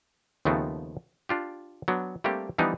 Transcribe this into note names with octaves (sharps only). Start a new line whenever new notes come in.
D#2 C#3 F3 A3 B3 C4
D4 F4 G4
F#3 B3 D4
G3 A3 A#3 C4 D4 G4
E3 F3 G3 B3 D4 D#4